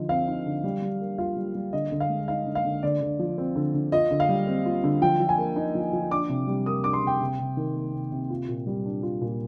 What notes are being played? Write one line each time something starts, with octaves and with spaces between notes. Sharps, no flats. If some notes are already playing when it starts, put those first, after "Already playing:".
Already playing: D3 F3 D#4
C4 F5
D#4
D3
G3
G3
A#3
F4 F5
G3
G3
D3 D#5
D3
F5
G#3
D#4 F5
D3
F5
D3
D3 D5
D3
F3
C4
D3
D3
F4 D#5
D3
F5
G3
C4
F4
D3
F3 G5
F3
G#5
A#3
D#4
F3
F3
D4 D6
C3
G3
A#3 D#6
D4 D6
C6
C3 G5
C3
C3
D#3
A#3
C3
C3
F4
A#2
G3
D4
F4
A#2